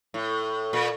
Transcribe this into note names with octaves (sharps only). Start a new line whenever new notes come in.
A2
A#2